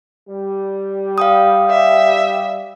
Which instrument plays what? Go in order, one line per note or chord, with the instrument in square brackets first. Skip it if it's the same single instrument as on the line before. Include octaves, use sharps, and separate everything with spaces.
[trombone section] G3
[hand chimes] F5 G5 D#6
[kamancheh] E5